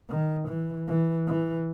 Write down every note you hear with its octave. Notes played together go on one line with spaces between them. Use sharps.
D#3
E3
E3
E3